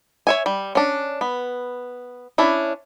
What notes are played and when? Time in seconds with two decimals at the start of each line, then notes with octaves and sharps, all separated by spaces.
0.27 C#5 E5 G#5
0.46 G3
0.75 C#4 D4
1.21 B3
2.38 C#4 D4 E4